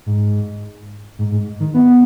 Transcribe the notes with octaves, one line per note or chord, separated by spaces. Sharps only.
G#2
G#2
G#2
D#3
B3